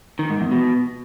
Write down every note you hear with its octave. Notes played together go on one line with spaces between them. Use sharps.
D#3
G#2
E2
B2